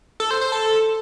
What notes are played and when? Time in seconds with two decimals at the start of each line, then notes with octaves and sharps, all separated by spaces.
0.20 A4
0.31 C5
0.41 C5
0.52 A4